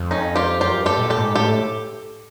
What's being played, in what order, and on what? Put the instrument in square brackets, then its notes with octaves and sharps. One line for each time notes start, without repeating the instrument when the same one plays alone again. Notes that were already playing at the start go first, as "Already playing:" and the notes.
Already playing: [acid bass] F2
[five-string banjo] C#4 D#4
F4 G4
[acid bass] F#2 [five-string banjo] F4 G4
[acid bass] G2
[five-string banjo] G4 A4
[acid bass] A#2
[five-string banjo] G4 A4
[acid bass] G#2
[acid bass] A2 [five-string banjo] G4 A4